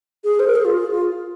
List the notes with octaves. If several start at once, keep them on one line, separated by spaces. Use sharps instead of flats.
G#4
C5
A#4
G#4
F4
G#4
F4